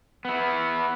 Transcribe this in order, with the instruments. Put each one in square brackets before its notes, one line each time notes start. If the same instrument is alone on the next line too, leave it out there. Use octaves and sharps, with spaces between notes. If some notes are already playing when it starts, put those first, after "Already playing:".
[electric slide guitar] B3 E4